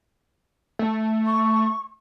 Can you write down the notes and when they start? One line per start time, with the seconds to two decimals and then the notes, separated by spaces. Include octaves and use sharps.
0.79 A3
1.26 C#6